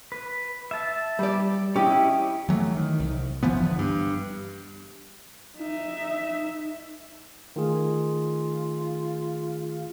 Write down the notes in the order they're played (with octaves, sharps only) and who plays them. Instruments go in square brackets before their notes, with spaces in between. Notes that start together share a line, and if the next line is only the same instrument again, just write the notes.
[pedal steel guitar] B4
E5 A5
[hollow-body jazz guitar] G3 D5
[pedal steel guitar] C#4 E4 D#5 [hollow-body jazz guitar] G4
[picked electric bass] E3 F#3 A3
D#3
C2
F#1 E3 F3 B3
G2 D3 B3
G2
[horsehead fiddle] D#4 E5
[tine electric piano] D#3 A3 G#4 [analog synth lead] F4